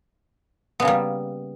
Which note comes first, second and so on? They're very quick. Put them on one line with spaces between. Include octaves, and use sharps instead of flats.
B3 C#3 A#3 G3